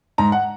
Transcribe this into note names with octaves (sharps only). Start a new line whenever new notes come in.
G#2 A#5
F#5